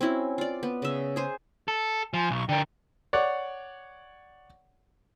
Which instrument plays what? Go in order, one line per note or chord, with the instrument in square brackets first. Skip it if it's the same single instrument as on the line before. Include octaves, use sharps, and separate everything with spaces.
[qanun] C4 C#4 E4 F#4
F4 D5
B3
C#3 E5
G#4 C5 G#5
[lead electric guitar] A4
[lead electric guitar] F3 [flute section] G#5 C6
[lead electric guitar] B1 [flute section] C#6
[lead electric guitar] D3 A#4 [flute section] D5 G5
[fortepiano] C#5 D5 F#5